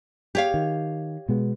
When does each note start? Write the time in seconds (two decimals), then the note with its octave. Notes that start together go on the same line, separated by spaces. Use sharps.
0.35 G4 C#5 F5
0.54 D#3
1.29 B2 G#3 B3